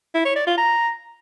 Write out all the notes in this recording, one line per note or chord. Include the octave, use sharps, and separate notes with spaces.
E4
C#5
D5
F4
A#5